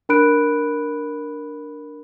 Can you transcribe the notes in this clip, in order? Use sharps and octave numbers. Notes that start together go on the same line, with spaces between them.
D4 A#4 B5 F#6 D7